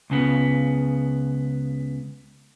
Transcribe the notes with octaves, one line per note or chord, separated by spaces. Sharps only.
C#2 C#3 B3